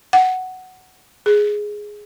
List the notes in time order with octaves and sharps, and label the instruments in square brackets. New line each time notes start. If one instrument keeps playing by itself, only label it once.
[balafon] F#5
G#4